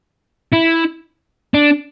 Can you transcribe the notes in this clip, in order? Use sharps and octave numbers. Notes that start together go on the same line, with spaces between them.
E4
D4